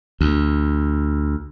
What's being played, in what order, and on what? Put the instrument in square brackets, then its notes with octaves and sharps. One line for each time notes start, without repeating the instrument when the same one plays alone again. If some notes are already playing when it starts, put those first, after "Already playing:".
[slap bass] D2